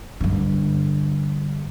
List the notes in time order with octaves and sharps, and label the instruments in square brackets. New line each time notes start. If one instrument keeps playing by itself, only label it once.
[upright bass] G2 D3